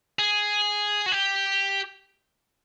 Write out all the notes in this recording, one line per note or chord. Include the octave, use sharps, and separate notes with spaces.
G#4
F#4
G4